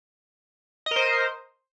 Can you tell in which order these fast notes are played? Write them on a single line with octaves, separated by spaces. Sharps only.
D#5 A#4 C5